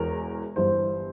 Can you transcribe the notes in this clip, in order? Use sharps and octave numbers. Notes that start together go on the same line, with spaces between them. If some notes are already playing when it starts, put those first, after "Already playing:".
Already playing: E1 E2 E3 A#4
G1 G2 E3 C5